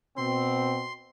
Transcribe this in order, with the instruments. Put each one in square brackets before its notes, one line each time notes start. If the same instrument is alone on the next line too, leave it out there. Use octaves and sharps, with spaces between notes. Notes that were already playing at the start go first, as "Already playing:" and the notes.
[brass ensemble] B2 C4 [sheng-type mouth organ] C6